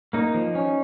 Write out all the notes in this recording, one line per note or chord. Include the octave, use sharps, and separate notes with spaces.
A#3 D#4
F3
C#4